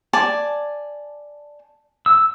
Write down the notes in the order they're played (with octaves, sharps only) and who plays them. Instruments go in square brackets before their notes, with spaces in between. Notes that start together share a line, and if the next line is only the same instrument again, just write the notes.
[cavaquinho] D5 G#5 A5
[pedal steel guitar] E6